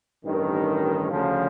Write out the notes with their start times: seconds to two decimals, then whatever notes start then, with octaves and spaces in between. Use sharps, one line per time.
0.24 A1 G2 D#3
1.09 D2 C#3 F3